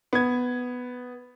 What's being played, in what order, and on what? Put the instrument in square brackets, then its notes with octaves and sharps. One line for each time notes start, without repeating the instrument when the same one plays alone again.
[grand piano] B3 G#6